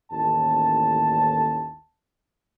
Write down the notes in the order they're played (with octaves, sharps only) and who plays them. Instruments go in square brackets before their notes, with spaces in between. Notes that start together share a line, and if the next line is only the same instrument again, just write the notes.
[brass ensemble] A1 D#2 A5